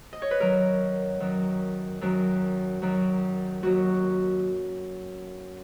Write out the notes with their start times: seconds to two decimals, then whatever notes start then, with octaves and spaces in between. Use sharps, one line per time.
0.13 D#5
0.22 C#5
0.31 B4
0.40 F#2 D#3 F#3 A#4
1.20 F#2 D#3 F#3
2.01 F#2 D#3 F#3
2.82 F#2 D#3 F#3
3.62 D#2 D#3 F#3 F#4